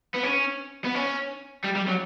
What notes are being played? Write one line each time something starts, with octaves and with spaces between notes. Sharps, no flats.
B3
C#4
B3
C#4
G3
G3
F#3